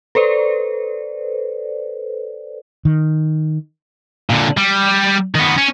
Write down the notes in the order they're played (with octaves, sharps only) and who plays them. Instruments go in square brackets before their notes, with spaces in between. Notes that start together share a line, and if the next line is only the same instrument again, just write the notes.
[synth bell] A4 B4 C5 D5
[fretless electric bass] D#3
[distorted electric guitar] A#2 D3
G3
D#3 B3
C#4